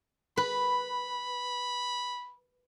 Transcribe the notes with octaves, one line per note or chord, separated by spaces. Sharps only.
B4 B5